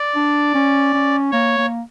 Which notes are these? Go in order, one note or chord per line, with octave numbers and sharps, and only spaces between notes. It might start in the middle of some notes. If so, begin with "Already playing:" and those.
Already playing: D5
D4
C#4
C#4
A#3 C#5
A#3